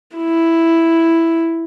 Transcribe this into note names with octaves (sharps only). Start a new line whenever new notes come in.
E4